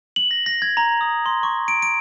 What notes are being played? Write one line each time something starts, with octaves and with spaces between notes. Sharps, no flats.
F#7
A#6
A#6
G#6
A#5
D#6
C6
C#6
D7
D7